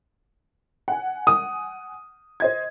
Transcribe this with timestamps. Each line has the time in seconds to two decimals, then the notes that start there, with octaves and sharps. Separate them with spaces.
0.88 F#5 G#5
1.27 D#6
2.40 C5 D#5 G#6